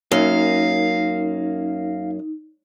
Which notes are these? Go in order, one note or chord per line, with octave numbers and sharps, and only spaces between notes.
F#2 A#3 C#4 D#4 F5